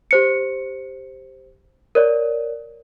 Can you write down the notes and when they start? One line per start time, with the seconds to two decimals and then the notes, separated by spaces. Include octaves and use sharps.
0.11 G4 C5 C#7
1.95 A#4 C#5 D5